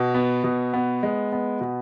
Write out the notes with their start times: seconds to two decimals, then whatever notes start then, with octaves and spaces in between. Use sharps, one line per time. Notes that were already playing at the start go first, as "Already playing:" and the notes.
Already playing: B2
0.14 B3
0.44 B2
0.74 B3
1.03 G#3
1.32 B3
1.61 B2